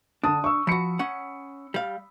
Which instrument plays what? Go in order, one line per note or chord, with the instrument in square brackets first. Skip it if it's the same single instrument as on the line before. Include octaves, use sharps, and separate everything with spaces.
[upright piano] D3 A5 D#6 [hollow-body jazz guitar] D4
[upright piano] C#6 E6
[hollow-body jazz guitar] F3 F#4 [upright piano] B5 C#7
[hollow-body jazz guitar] C#4 F#5
G3 F5